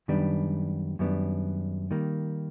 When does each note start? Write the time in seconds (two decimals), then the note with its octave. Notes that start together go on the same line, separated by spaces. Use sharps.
0.08 F#2 D#3 G3 B3 D4
0.99 F#2 D#3 G3 B3 D4
1.91 D#3 G3 A#3